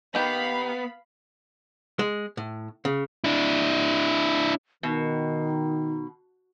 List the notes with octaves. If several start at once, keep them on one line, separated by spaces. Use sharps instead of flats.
D#3 B3 G4 F5 B5
G#3
A2
C#3
D4 E4
B2 D#3 D#4